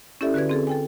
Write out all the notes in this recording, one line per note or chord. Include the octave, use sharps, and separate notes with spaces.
C#4 E4 G4 A4 D5 E5
D3 F#4 B4 D5 G#6
C4 G#4 A4
A4 G5 G#5